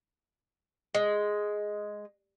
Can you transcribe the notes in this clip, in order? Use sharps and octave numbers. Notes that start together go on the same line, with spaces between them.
G#3